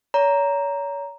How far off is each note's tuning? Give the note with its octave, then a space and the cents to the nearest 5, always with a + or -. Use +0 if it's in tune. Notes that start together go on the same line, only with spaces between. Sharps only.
C#5 +35 A#5 +0